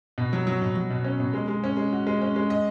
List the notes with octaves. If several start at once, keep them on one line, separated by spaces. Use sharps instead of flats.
B2
F#3
F#3
B2
F#3
B2
C#4
B2
G#3
G#3
C#4
G#3
F#4
G#3
C#4
G#3
D#5